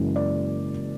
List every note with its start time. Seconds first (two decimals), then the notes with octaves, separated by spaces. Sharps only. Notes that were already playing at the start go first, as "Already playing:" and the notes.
Already playing: F#1 F#2 E3 G#3
0.16 D5